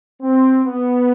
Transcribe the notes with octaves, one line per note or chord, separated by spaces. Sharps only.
C4
B3